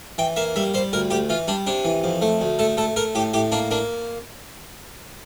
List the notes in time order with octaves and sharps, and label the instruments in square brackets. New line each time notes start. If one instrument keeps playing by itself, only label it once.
[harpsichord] E3 G5
A#3 E5
G3 E5
G3 C5
D2 A#4
D2 G4
E3 F4
G3 D4
C3 D4
E3
F2
A3
D2
A3 A4
A3 A4
A3 A#4
A2 G4
A2 G4
A#3 D4
A#3 D4